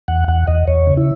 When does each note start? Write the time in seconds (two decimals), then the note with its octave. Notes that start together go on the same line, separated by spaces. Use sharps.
0.08 E2 F#5
0.28 E2 F#5
0.47 E2 D#5
0.67 E2 C#5
0.87 C#3
0.97 E4